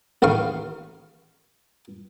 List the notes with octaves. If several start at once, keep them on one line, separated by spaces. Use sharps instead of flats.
A1 D#2 C#3 F5 C#6